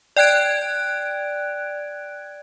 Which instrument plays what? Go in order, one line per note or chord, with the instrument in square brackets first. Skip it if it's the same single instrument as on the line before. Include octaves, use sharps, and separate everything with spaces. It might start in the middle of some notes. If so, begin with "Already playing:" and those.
[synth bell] D5 G5 F#6 G#6 D7